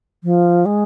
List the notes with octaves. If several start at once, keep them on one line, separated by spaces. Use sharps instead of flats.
F3
G#3